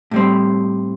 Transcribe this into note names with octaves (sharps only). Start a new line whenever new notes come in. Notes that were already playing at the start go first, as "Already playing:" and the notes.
A2 G3 C4